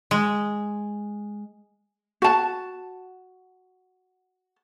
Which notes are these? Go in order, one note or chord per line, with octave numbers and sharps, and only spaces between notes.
G#3
F#4 A5